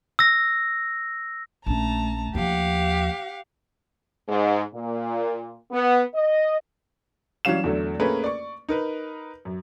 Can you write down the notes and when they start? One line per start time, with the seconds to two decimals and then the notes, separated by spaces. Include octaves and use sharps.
0.19 E6 A#6
1.66 A#1 A3 C#4 A5 A#5
2.35 D#2 F3 G4 F5 F#5
4.28 G#2
4.73 A#2
5.71 B3
6.14 D#5
7.45 E3 F#3 G3 C#4 F5 E7
7.64 E2 D3 F#3 A3
8.00 A3 A#3 C#4 G#4 A#4 B4
8.24 D5 C#6
8.69 D#4 A#4 B4
9.45 F#2